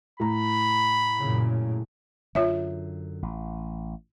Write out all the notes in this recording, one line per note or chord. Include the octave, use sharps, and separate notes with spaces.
A2 A#5 B5
F#2 A#2 C#3
F#2 D3 F4 C#5 E5
A1